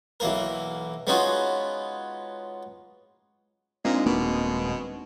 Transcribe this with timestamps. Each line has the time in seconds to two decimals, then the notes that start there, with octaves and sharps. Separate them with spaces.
0.20 B1 E3 A#3 A#4
1.07 G#3 B3 C#4 D#4 F4 F#4
3.85 A#2 G#3 C4 D4 D#4
4.06 D#1 B2 A#3